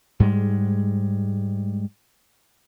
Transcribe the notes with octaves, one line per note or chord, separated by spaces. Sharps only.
G#2 G3 G#3